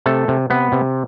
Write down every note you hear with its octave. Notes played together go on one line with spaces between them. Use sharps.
C3 A3 A4
C3
C3 B3 B4
C3